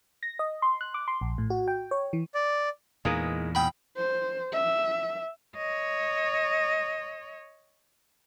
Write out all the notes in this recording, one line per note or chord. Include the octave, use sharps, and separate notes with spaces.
A#6
D#5
C6
F#6
D6
C6
A#1
A2
F#4
G5
C#5
E3
D5
E2 A#2 E3 G#3 A#3 D#4
G#2 B2 G5 B5
C5
E5
C#5 D#5